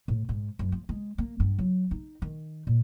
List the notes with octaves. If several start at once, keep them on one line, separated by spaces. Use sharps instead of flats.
A2
G#2
F#2
F3
G#3
A#3
G2
F#3
D#4
D#3
A#2